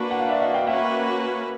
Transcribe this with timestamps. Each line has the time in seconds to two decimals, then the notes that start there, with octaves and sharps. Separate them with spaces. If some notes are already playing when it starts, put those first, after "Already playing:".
Already playing: A#3 D4 F#4 B4
0.11 F#5
0.19 F5
0.29 D5 E5
0.41 D#5 F5
0.54 F5 G5
0.67 A#3 C#4 F#4 B4 E5 F#5